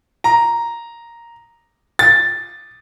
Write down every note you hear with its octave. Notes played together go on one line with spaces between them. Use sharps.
A#5
A6